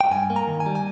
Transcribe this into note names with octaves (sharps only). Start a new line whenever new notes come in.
G5
G2 G#5
A#3
A#5
D#3
G#5
G3
G#5